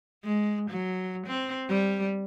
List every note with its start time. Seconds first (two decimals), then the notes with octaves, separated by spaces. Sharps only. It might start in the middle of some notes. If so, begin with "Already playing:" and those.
0.24 G#3
0.70 F#3
1.27 C4
1.69 G3